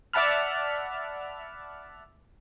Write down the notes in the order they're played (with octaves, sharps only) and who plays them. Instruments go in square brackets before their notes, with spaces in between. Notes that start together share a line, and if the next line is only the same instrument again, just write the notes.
[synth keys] D5 E5 F#5 A5 B5 F6